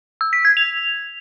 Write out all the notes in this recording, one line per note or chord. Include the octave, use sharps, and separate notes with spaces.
E6
B6
G#6
F7